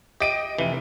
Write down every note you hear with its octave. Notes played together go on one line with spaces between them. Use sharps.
G4 D#5 D7 D#7
F1 E3 D#7